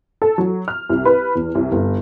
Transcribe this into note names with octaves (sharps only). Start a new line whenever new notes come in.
A4
F#3
F6
C2
B4
E2
C2
G1